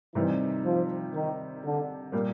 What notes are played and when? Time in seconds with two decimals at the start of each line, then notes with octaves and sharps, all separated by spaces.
0.15 C3 D#3 E3 G3 C4 D#4
0.65 F3
1.14 D#3
1.64 D3
2.12 A#2 G3 A#3